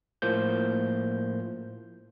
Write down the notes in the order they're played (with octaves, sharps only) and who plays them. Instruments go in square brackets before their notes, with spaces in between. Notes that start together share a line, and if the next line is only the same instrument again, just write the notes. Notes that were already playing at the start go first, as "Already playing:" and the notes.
[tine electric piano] A2 F3 A#3 C5 G6